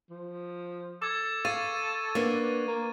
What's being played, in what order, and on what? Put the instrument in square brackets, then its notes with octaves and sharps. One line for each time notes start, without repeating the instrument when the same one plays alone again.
[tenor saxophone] F3
[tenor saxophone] A4 [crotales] D6 G#6
[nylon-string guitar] F5 [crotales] C#6 A6 D#7
[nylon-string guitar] A#3 B3 D4
[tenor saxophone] A#3